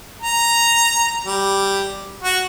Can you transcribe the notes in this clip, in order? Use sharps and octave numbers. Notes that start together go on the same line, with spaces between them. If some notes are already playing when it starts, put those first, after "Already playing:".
A#5
G3
F#4